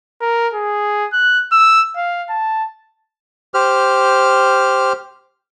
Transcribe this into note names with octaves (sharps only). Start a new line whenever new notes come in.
A#4
G#4
F#6
E6
F5
A5
G4 C5 F6